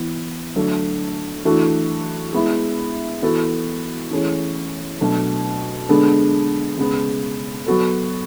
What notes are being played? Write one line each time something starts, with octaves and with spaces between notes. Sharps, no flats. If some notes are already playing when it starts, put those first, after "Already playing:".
Already playing: E3 B3
D3 F#3 A3 D4
E3 A3 D4 F#4
G#3 B3 E4
E3 B3 F#4 A4
E3 A3 C#4 G#4
B2 F#3 A3 D4
D3 G#3 B3 D4 A4
C#3 G#3 B3
F#3 B3 F#4 A4